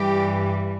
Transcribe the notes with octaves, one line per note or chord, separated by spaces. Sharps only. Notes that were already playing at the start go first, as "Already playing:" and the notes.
Already playing: G2 E3 G3 G4